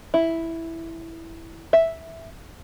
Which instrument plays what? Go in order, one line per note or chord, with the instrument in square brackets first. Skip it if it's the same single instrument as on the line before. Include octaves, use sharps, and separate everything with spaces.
[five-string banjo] E4
E5